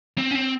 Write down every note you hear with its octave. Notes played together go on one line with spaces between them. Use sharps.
C4
C#4
C4